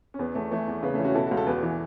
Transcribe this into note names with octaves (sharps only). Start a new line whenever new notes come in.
C#4
E2 B3
E2 A3
E3 A3
E2
C#3 B3
A3 C#4
E3
C#4 F#4
B2 E4 A4
C#2 F#4
A4
E2 F#4 B4
E3